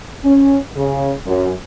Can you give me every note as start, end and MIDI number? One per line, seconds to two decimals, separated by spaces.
0.24 0.58 61
0.76 1.12 49
1.26 1.51 42